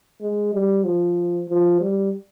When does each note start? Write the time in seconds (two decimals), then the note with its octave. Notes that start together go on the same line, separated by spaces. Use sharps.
0.21 G#3
0.53 G3
0.84 F3
1.49 F3
1.81 G3